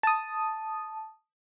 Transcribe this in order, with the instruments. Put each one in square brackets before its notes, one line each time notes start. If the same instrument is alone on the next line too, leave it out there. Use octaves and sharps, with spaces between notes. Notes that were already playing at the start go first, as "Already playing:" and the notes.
[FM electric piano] A5 D#6